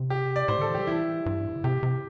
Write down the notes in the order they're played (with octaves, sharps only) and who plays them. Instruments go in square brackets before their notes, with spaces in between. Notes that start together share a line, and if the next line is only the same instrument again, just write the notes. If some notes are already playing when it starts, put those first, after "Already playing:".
Already playing: [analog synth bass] C3
[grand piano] G4
D5
[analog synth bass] A2 [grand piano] C5
[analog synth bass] D3 [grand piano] A4
[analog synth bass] E3
[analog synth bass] G3 [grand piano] G4
[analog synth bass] E3 [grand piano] E4
[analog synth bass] G2
A2
D3
[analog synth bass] C3 [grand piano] G4
[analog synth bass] C3